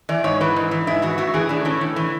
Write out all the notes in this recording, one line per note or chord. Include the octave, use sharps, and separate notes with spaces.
E3 D5
G#2 C#5
E3 B4
G#2
E3
G#2 E4
E3 F#4
A2 F#4
E3 G#4
A2 D4
E3 C#4
A2
E3